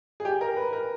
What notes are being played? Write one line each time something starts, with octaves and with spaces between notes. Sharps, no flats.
G#4
G4
A#4
B4
A#4